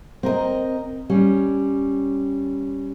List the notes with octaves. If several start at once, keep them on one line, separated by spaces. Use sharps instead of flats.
C4 A#4 D#5
G3 C#4